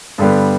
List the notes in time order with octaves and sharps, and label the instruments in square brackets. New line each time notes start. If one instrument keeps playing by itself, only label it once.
[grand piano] G2 D3 G3 B3